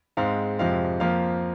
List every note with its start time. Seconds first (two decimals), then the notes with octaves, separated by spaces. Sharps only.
0.17 G#2 G#3 C4 F5
0.59 F2 C3 F3 G#3 C4 F5
1.00 F2 F3 A#3 F5